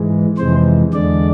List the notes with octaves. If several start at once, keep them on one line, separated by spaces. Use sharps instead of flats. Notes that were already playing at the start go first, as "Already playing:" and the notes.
Already playing: G#2 E3 G#3
F2 C3 E3 G#3 C5
E2 D3 G#3 D5